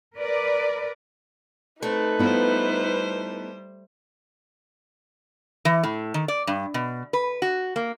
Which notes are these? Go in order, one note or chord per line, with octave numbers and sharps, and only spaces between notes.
A#4 B4 D5
A3 C4 D#4 B4
G3 B3 E4 F4 C5
E3
A2
D#3
D5
G2
B2
B4
F#4
A#3